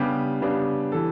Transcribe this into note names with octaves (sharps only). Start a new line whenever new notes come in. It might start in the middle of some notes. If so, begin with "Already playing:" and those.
Already playing: C#3 G3 B3 D4 G4
C#3 G3 B3 D4
E3 G3 A4